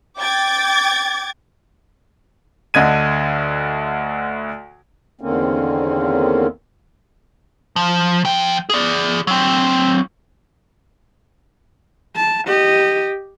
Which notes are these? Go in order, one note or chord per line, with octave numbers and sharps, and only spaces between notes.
G5 D6 G#6 A6
D2 D3 D#5 G#6 D#7
E2 D3 D#3 A#3 C4 C#4
F3
F3 G5
G#4 D5
F#3 C4
A5
G4 D#5